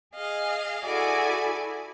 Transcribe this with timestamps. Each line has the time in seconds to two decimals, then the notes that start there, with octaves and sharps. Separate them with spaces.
0.15 G#4 D#5 F5
0.84 E4 F#4 G#4 A4 D5 G#5